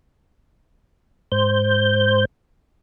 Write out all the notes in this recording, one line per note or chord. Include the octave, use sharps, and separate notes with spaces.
G#2 C5 G6